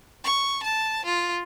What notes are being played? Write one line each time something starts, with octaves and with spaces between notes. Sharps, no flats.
C#6
A5
F4